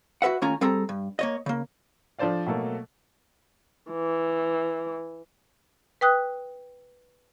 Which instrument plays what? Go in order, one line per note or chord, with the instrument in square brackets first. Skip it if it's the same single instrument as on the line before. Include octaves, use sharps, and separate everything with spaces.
[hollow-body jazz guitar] F#4 G#4 B4 E5 F#5
D#2 A3 C#4 F4 G#5 A#5
G3 C4 G#4 A4 A#5
G2
A#3 C#5 D#5
C#3 A#3
[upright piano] F3 D4 A4 C5 D5 F5
B2 F#3 A3 A#3 A4
[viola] E3
[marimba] B4 G5 D#6 F#6